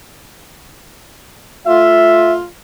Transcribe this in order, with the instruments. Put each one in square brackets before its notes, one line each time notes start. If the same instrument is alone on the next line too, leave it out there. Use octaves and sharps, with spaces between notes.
[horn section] A3 F4 [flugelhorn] E5